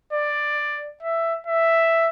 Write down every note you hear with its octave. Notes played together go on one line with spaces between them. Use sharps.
D5
E5
E5